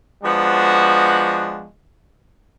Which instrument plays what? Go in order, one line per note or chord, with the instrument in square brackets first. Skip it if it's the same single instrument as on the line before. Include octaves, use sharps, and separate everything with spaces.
[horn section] F3 G#3 B3 D4 F#4